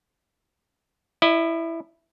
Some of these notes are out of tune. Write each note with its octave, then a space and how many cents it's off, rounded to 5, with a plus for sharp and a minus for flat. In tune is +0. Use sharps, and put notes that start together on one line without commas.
E4 +0 D#5 -40